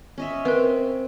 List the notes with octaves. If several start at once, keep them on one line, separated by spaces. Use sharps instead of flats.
C#4 D#5 E5
C4 A#4 B4